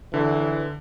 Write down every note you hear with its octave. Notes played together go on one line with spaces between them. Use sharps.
D3 E3